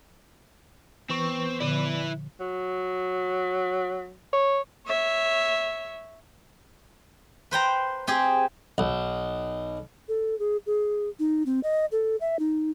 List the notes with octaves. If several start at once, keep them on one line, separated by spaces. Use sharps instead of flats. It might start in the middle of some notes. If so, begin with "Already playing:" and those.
E3 B3 C4 B4 C#6
A#2 D3 F3 E4 B4 D5
F#3
C#5
C#5 E5
B4 C5 G5 A#5
C4 G4 G#4
B1
A4
G#4
G#4
D#4
C4
D#5
A4
E5
D#4